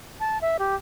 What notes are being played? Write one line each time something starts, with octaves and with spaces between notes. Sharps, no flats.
A5
E5
G4